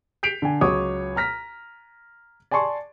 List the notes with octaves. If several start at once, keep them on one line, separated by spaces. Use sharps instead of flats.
G6 B6 C7 D7 F7
D3 G#5
C#2 F#3 C#5 D6 D#6
A#5 F6 A#6 B6
D5 G#5 A5 C6 C#6